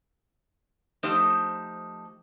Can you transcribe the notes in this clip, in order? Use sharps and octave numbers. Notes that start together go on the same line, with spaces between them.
F3 A3 D#4 G4 C5